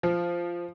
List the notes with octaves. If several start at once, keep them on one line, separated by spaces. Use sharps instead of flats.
F3